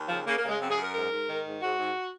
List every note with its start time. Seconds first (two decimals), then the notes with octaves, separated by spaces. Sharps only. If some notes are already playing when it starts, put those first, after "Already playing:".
Already playing: D#2
0.09 C#3 F3
0.26 C#3 A#3
0.37 A#3
0.43 C#3
0.49 G#3
0.59 F#2 C4
0.71 G#4
0.77 F#2
0.82 A#4
0.93 G#2 A#4
1.11 G#2
1.27 D#3
1.45 G#2
1.61 G#2 F#4
1.78 G#2